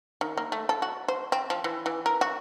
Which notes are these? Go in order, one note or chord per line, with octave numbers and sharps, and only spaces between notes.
D#3
A#3
A3
A4
F#4
C5
C4
F3
E3
E3
A#4
F#4